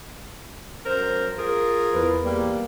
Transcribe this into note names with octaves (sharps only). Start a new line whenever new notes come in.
F#2 A#4 C5
F4 G#4 A#4
E2 B4
G3 A#3